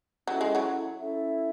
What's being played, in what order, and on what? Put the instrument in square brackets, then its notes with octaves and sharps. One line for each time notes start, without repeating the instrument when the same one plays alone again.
[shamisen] F#3 [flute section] C#4 E4 A4 E5
[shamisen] G#3
F#3
[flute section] C#4 E4 A4 E5